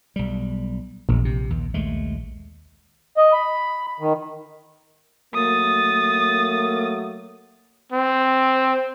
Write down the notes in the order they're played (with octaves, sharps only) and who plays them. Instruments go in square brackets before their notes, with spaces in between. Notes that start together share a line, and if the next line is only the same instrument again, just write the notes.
[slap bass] B1 G3
[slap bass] E1 [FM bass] A#1
[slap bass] C3
D#2
D#2 G#3 A3
[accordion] D#5
B5
D#3
[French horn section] F#3 A3 A#3 [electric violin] D#6 A6
[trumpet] C4